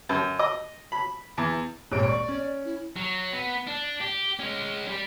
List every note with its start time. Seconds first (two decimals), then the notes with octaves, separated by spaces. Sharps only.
0.09 F#2
0.39 D#5
0.92 B5
1.37 E2
1.92 D#1 G#1 C#5 D7
2.08 D5 C#6
2.28 C#4
2.65 E4
2.96 F#3
3.33 B3
3.67 D4
4.01 G4
4.40 G#3 C#4
4.88 G3